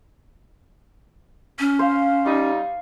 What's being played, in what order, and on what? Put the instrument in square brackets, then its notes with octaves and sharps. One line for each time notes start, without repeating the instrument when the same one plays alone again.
[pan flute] C#4
[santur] C5 F5
[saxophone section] G3 D#4 [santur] C#6